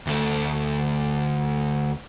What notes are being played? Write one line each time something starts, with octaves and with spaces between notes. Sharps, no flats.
D2 A3